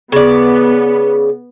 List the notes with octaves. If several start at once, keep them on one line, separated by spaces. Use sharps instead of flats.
C#3 B3 D5